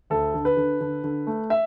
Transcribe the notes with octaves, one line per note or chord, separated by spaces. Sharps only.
D2 A4
D3
B4
D3
D3
D3
A3
E5